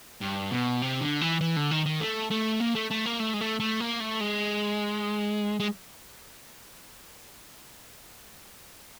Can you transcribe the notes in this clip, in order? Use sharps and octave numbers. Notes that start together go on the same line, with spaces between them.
G2
B2
C3
D3
E3
E3
D3
D#3
D#3
A3
A3
A#3
A3
A3
A#3
A3
G#3
A3
A3
A#3
A3
G#3
G#3